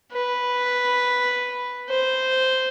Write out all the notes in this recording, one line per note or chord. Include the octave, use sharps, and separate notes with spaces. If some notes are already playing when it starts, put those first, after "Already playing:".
B4
C5